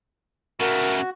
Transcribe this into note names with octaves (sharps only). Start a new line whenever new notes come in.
C#3 A3 F#4 A#4